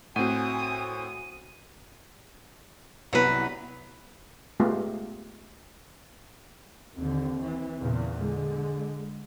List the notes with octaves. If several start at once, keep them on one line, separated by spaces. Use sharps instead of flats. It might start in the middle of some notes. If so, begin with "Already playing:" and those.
A2 C4 F#4 F#5 G#5 D#6 D#7
C2 F#3 B3 B4
G#3 A3 B3 F4 G4
D#2 D3 C4
E3
E2 A#2 C#3
D3 G#3